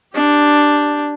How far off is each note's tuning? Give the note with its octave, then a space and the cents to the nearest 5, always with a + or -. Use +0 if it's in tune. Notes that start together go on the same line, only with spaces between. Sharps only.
D4 +0 G4 +0